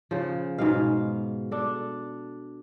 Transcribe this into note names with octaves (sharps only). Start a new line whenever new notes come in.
C#3 F3
G#2 B2 F5
D4 A4